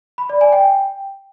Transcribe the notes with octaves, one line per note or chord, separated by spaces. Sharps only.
B5
D5
G#5
G5